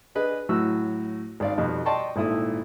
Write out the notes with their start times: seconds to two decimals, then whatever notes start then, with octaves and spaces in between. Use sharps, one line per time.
0.15 D4 G#4 B4 D#5
0.49 A2 F#3 F#4 E6
1.40 G#1 D5 F5
1.57 F2 B2 G3 D#4
1.86 D5 D#5 G5 A5 C6 C#6
2.16 G#1 A#2 E4 A4 D#6